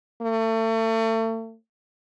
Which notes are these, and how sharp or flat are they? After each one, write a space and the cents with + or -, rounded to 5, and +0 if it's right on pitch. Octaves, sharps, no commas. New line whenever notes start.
A3 +35